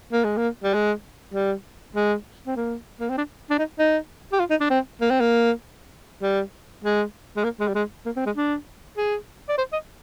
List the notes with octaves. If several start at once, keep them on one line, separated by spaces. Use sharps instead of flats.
A#3
G#3
A#3
G3
G#3
G3
G#3
C4
A#3
A#3
C4
D4
D4
D#4
D#4
G4
F4
D#4
D4
C4
A#3
C4
A#3
G3
G#3
G#3
A#3
G#3
G3
G#3
A#3
C4
G#3
D4
G#4
D5
C5
D#5